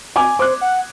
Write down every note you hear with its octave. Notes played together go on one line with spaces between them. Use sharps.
G#5 D6 G#6
C5 D6 F#6
F#5